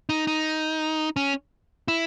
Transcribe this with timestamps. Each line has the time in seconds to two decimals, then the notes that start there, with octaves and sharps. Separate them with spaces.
0.09 D#4
0.27 D#4
1.16 C#4
1.88 E4